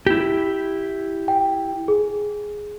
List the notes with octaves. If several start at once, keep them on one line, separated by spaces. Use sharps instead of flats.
E4 G4
G5
G#4